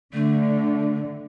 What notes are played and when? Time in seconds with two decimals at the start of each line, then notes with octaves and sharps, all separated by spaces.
0.14 D3 A3